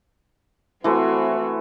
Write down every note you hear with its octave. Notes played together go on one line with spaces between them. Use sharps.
E3 A3 C4 F#4 C5